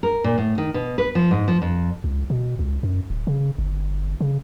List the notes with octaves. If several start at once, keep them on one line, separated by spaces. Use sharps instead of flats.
A#4
A#2
A2
D#3
B2
B4
F3
G#2
F3
F2
C#2
B2
C#2
F#2
D1
C#3
G1
C#3